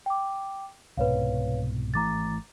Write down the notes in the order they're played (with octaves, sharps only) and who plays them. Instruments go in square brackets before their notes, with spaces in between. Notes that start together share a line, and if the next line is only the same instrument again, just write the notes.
[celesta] G5 D6
[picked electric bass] C2 G#2 B2 [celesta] B4 C#5 F5
[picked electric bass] G#1 E3 A3 [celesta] A#5 D6 A6